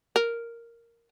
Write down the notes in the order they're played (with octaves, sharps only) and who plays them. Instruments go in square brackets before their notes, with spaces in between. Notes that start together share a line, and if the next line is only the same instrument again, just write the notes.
[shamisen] A#4